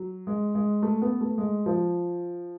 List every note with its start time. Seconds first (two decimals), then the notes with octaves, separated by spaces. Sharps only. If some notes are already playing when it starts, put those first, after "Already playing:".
Already playing: F#3
0.27 G#3
0.55 G#3
0.82 A3
1.02 B3
1.21 A3
1.38 G#3
1.66 F3